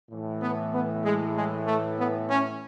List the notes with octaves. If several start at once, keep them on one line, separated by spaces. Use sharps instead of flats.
A2 E3
B3
B3
G#3
G#3
A3
B3
C#4